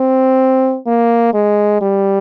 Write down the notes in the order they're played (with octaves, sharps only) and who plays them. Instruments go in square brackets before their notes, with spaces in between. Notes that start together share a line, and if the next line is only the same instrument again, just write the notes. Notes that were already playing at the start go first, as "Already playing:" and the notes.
Already playing: [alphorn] C4
A#3
G#3
G3